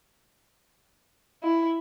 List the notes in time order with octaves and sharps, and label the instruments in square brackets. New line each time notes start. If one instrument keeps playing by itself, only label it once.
[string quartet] E4